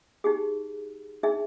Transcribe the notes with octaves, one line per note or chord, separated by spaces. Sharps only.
D#4 G4 G#4
D4 D#4 G#4 E5